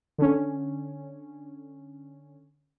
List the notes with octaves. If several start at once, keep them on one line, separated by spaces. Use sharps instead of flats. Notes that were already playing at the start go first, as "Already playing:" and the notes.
D3 C#4